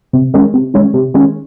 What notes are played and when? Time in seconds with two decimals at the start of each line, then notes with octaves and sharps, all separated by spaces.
0.13 C3
0.34 D#3 G#3 C#4
0.54 C3
0.74 D#3 G#3 C#4
0.94 C3
1.14 D#3 G#3 C#4